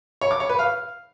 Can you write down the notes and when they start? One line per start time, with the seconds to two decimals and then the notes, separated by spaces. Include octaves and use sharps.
0.21 C#5
0.31 D6
0.40 C#5
0.49 B4
0.59 F5